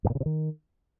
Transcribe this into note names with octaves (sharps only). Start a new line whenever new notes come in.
G2
A#2
C#3
C3
D#3